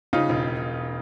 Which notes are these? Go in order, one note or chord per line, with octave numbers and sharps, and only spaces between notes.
C#3 D#4 F4
E1